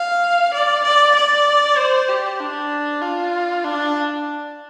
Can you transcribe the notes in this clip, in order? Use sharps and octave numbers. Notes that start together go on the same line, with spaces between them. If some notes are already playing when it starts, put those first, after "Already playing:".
Already playing: F5
D5
D5
D5
C5
G4
D4
F4
D4